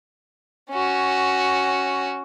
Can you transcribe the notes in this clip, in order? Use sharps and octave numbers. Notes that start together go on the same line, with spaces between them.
C#4 F#4